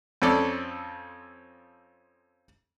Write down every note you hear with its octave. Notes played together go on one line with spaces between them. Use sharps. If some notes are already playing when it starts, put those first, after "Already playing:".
F2 C4 C#4 A4 D5